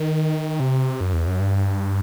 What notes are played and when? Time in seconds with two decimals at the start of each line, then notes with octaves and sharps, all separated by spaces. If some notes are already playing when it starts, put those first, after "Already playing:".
Already playing: D#3
0.60 C3
1.01 F#2
1.13 E2
1.27 F#2
1.40 G2